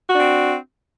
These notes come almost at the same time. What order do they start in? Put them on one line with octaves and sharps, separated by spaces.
F#4 D4 C4